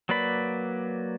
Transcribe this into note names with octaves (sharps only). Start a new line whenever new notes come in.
F#3 A#3 B4 D5 B5